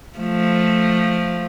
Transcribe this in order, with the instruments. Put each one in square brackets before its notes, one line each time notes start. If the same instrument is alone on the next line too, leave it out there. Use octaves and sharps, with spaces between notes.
[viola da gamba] F3 A3